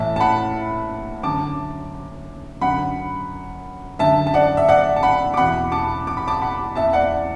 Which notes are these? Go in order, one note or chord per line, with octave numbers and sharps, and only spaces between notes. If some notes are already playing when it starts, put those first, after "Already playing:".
Already playing: A2 E3 E5 A5
A5
F#5 B5
F#2 D3 A5 D6
F#2 D3 F#5 B5
F#2 D3 E5 A5
A5
D5 F#5
E5
D5 F#5
A5
F#5 B5
D6
E2 B2 F#5 B5
A5 D6
D6
B5
A5 D6
F#5 B5
E2 E3 E5 A5
D5 F#5